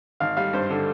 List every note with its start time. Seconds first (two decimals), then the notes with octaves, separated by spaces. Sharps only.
0.20 G#1 F5
0.37 G3 F5
0.53 G2 C5
0.70 D3